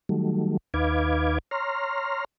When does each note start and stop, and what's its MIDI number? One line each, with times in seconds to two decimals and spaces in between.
0.09 0.57 51
0.09 0.57 54
0.09 0.57 55
0.09 0.57 57
0.74 1.38 39
0.74 1.38 63
0.74 1.38 71
0.74 1.38 77
0.74 1.38 86
0.74 1.38 92
1.51 2.25 73
1.51 2.25 82
1.51 2.25 84
1.51 2.25 89